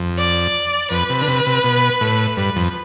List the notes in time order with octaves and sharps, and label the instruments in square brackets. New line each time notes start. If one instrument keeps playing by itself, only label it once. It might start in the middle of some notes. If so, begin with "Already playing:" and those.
Already playing: [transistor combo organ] F2
[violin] D5
[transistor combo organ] F2 [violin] B4
[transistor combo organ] C3
D3
C3
C3
B2
A2
[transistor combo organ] G2 [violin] B4
[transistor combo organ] F2